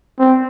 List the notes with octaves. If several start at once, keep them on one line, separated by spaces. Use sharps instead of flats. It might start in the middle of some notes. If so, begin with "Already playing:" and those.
C4